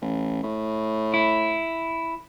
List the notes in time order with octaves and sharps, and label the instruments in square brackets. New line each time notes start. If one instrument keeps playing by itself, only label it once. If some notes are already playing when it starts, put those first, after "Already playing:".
[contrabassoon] A1
A2
[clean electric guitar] E4